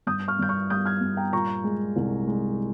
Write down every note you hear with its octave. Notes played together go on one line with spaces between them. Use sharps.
G2 D#6 G6
C#6 F6
G2 G6
C#6 F6
G3 D#6 G6
F6 G#6
G2
G5 A#5
A#2 A#5 C#6
G#3
C2
G#3